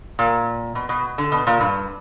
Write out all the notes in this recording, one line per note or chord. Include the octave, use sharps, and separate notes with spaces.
A#2
B2
B2
D3
B2
A#2
G2